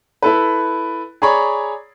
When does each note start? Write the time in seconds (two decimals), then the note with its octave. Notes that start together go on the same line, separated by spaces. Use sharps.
0.22 E4 A4 B4
1.22 G#4 C#5 D5 A#5 B5 C#6